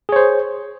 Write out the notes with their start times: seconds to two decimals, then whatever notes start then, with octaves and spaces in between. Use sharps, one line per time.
0.09 G#4
0.12 C#5
0.16 C5